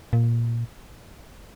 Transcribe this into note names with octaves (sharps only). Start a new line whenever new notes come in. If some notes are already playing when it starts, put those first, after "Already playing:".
A#2